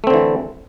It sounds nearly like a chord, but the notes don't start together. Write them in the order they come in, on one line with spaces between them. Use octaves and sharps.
A3 C4 D3 E3